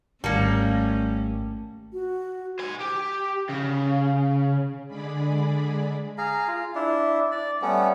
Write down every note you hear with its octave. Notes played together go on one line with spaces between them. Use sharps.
G#1 G3 A3 A#3 C#4 A5 C#7
F#4
C5 G#5
G4
C#3
D3 G#3 G#4 D5 B5
G#4 F5 A#5
F4
D4 E4
D5
G3 A3 B3 C#4